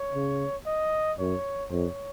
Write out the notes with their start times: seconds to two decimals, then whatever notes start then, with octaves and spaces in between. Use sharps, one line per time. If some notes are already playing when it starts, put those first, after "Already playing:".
Already playing: C#5
0.15 C#3
0.66 D#5
1.19 F#2 C#5
1.71 F2 C#5